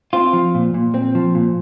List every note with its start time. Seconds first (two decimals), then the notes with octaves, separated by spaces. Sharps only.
0.13 C4 F4
0.33 F3
0.55 A#2
0.74 A#2
0.94 C4
1.15 F3
1.35 A#2